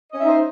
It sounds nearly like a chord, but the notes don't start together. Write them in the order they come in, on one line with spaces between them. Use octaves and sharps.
D#5 C#4 E5 D#4 C5